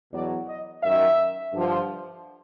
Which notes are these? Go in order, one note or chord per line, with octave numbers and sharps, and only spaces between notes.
E2 B2 F#3 D5
D#5
F#2 D#3 F#3 E5
G2 D3 F3